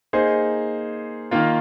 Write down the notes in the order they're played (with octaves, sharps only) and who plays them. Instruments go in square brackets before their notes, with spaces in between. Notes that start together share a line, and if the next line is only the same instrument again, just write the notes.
[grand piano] A#3 D#4 G#4 C5
D#3 A#3 F4